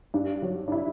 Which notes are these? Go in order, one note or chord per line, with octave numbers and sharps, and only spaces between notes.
G2 D4
F#3
D4
E4